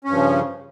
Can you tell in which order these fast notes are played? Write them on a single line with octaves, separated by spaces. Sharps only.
C#4 G2 F3 C#3